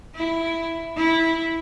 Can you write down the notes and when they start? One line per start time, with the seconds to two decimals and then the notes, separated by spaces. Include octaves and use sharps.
0.15 E4
0.97 E4